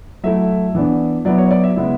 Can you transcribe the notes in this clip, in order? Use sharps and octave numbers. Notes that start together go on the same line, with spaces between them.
F#3 A3 E4 E5
E3 B3 D4
F#3 B3 E4 D5
C#5
D5
E5
C#3 G#3 B3 E4